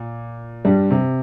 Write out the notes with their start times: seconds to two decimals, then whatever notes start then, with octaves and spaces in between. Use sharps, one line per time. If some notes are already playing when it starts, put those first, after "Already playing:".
Already playing: A#2
0.65 G2 G3
0.90 C3